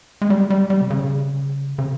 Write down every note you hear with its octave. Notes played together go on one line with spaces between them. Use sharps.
G#3
G3
G3
G3
C3
C#3
C#3